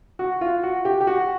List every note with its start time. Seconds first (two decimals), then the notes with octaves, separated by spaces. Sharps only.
0.19 F#4
0.41 F4
0.63 F#4
0.85 G4
1.01 G4
1.07 F#4